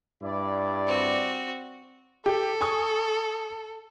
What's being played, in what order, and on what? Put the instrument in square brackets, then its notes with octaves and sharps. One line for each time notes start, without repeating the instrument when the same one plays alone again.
[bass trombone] G2 [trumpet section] E4 D5
[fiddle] C4 F#4
[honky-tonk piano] G4 [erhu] A4
[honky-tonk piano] G#5 C#6 D#6